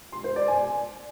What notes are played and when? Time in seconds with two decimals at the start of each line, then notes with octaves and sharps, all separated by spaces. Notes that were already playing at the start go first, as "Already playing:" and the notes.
0.12 C6
0.24 C5
0.36 D5
0.48 G#5